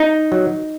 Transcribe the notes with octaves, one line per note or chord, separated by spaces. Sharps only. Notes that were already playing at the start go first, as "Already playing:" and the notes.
Already playing: D#4
F#3